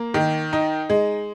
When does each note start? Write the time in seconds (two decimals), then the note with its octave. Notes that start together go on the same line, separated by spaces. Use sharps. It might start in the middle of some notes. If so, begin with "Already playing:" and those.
Already playing: A#3
0.14 D#3
0.53 D#4
0.90 G#3